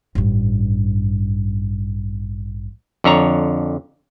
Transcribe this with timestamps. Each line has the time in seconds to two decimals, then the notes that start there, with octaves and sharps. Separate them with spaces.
0.15 A1 G2
3.04 F2 D3 C#5 A#5